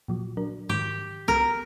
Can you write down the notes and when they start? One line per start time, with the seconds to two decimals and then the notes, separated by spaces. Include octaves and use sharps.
0.08 A#2 F3 F#3
0.37 F#3 D4 A#4
0.69 G#2 D#3 G4
1.28 C2 B3 A#4